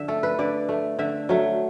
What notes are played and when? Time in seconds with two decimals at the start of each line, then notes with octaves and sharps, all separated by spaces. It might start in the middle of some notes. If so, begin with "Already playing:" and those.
Already playing: D3 E5
0.08 A3 A4
0.23 B4
0.39 D3 D5
0.69 A3
0.99 D3 E5
1.29 F#3 A3